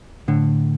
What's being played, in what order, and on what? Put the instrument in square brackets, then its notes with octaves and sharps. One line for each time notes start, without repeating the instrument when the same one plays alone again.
[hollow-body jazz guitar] A2 D3